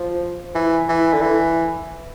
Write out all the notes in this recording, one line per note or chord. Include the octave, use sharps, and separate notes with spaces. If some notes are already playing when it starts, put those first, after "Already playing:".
Already playing: F3
E3
E3
D3
E3